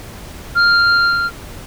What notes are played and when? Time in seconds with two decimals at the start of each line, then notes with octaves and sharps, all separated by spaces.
0.55 F6